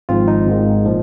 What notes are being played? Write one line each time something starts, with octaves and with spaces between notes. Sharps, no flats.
G#1 G#2 F3 C4 F4
D#4
G#1 G#2 D#3
A#2 F3